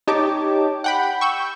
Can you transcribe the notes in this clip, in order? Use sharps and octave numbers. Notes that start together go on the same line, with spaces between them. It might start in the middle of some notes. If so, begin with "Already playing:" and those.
D#4 G4 C#5 A5 D6
F#5 G5 B5
C#6 E6 G6